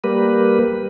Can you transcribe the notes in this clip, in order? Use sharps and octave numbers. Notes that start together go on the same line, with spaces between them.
G3 A#3 B4